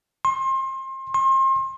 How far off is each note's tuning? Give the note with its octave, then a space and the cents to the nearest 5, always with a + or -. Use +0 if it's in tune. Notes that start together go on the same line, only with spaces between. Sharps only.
C6 +30
C6 +35